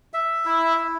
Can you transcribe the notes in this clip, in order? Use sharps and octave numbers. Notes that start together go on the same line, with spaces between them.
E5
E4
E4